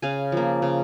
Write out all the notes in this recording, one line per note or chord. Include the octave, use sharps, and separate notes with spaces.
C#3 F5 G#5
F3 A#3
C#3